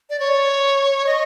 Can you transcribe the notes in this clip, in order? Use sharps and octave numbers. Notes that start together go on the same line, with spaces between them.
D5
C#5
D#5